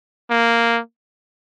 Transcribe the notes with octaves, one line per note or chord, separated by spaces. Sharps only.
A#3